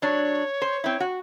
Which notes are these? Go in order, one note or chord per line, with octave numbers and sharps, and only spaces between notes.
F#3 D4 C#5
C5
C4 E4
F#4